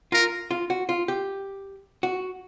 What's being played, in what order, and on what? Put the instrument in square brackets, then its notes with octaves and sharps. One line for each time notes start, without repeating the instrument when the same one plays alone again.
[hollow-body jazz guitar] F4 [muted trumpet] A#4
[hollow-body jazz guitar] F4
F#4
F4
G4
F#4